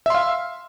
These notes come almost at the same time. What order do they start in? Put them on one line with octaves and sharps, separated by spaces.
E5 C6 F5